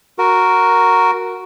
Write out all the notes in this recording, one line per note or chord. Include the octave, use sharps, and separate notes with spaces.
F#4 A#4